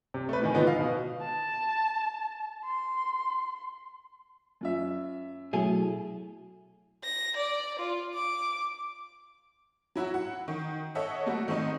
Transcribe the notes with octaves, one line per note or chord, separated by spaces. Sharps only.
C3
A3 B4
A2 D#3 G#5
D3 F3 G#3 B3 D#4
F5
B2
A5
C6
F#2 F4 E5
B2 F#3 A3 E4 G#4
A#6
D5
F4
D6
F#3 E4 F#4
F#5
D#3
A4 C#5 D#5 E5 F#5
G3 A3 A#3 F#4
D#3 A3 C4 D#4